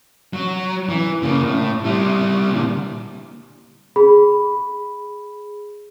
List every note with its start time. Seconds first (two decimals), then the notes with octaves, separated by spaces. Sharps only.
0.33 F#3
0.89 E3
1.22 C#3 A#3
1.43 A2
1.84 G3 E4
2.51 A#2 D3
3.96 G#4 B5